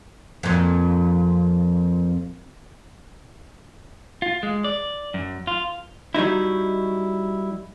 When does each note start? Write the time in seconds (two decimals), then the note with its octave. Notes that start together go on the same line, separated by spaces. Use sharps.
0.43 F2 A#2
4.22 F4
4.43 G#3
4.64 D5
5.14 F#2
5.47 F4
6.15 F#3 G3 D#4 E4